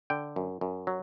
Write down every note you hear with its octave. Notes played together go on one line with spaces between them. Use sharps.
D3 G5
F#2
F#2
F#3